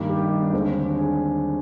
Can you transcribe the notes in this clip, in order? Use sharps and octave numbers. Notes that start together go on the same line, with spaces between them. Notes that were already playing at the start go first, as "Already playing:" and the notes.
Already playing: G2 D#3 G3 A#3
G4
D#4
D4
D4
D#2 D3 G#3 C4
D4
G#4